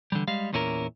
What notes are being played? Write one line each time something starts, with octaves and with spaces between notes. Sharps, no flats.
D3 E3 G3
G3 G#3 F5
E2 A#2 C#4 E4 G#4 A#4